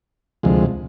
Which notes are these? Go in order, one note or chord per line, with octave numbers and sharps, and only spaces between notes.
D2 C3 F3 G#3